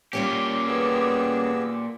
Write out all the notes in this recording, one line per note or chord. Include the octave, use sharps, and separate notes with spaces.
A#2 G3 A#3 C#4 G4 G5 D6
B3 G#4 E6